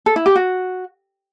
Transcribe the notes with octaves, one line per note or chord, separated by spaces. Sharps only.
A4
E4
G4
F#4